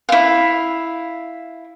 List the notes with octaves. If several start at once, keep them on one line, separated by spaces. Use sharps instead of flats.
E4 F5